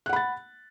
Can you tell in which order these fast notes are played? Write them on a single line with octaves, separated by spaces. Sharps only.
F#6 F#5 B5 A6